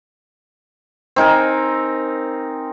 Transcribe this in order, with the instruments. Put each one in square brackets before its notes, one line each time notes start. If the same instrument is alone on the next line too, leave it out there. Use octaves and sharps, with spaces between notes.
[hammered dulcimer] C4 D#4 A#4 G#5